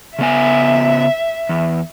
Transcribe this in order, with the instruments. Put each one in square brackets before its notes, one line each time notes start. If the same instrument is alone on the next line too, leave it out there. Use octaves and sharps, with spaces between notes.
[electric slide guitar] C#3 B3 G#5 [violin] E5
[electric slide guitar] E2